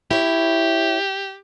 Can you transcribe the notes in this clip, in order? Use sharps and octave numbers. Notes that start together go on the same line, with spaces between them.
E4 G4 C#5